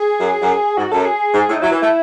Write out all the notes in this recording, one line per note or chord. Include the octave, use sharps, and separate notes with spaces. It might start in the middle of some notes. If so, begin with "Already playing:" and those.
Already playing: G#4
F#2
F#2
G#2 F#4
F#2 A4
G#4
G#2
A2
D#4
F#3 E4
E3
A3